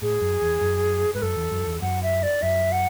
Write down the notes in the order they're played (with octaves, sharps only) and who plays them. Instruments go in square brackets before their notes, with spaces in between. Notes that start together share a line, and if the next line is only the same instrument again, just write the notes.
[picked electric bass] A2 [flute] G#4
[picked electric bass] F#2
E2
F#2
[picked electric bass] G#2 [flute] B4
[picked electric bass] F#2 [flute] A4
[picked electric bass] E2
F#2
E2
[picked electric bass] F#2 [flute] F#5
[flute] E5
D5
[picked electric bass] F#2 [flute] E5
[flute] F#5